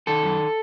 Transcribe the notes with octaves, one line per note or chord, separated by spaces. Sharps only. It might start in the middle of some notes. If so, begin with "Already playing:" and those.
D#3 A4
F#2